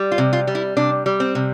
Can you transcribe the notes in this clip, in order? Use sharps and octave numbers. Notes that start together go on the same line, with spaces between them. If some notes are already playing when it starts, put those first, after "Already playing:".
Already playing: G3
F4
C3
F4
G3
E4
C3 D4
G3
C4
C3